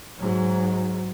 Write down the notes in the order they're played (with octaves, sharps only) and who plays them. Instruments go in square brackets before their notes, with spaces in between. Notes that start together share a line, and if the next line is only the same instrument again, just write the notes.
[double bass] G#2 F#3